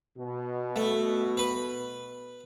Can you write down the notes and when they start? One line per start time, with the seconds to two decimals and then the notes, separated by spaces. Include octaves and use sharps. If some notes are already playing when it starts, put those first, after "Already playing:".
0.18 B2
0.76 A3
1.37 B4 B5